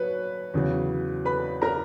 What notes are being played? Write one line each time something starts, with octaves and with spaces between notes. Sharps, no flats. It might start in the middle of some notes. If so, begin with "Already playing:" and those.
Already playing: F#3 B4 C#5 B5
E2 C#3 F#3
B4 B5
A#4 A#5